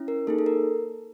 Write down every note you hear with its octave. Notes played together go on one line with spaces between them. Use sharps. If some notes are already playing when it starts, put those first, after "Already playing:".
Already playing: C#4 E4
A#4
A#3 D#4 G#4 A4
A4
A#4